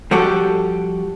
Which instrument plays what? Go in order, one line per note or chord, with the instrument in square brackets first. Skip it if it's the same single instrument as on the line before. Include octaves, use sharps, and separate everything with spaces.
[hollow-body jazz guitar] F3 G3 F#4 G4 A4